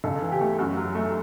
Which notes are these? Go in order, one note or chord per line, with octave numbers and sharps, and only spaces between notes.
C#2 A4
E3
G4
A3
F#2 F#4
F#3
A3